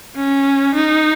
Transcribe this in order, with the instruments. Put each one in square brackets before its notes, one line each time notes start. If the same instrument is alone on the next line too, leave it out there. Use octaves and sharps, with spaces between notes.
[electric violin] C#4
D#4